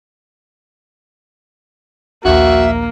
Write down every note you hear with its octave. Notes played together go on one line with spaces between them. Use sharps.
A#1 D#2 A#3 F#4 E5